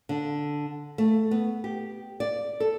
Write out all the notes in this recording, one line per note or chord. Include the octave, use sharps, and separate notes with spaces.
D3
A3
B3
G4
D5
A4